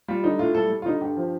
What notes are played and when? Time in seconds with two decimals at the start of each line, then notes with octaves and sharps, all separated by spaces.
0.08 G3 F4
0.23 D3 D#4
0.39 A2 F4
0.54 G3 A4
0.70 G3
0.82 F4
0.86 D3 D#4
1.01 G2 G4
1.17 F3